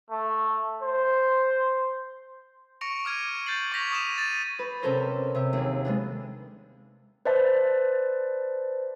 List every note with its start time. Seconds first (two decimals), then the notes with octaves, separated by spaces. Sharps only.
0.10 A3
0.82 C5
2.81 C#6 A#6 C#7 D7 F7
3.05 D6 F6 G#6 D#7
3.46 G6 A6 C7 F#7
3.72 C#6 G6 G#6 A#6 B6 F7
3.91 C#6 D#6 D#7 E7
4.18 A6 D#7
4.59 B4
4.82 C3 C4 C#4 A4 A#4 C5
5.35 C3 E5
5.53 D#2 G#4
5.85 G#3 B3 D4
7.25 B4 C5 D5 E5 A5